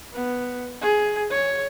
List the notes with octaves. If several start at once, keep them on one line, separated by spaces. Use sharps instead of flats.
B3
G#4
C#5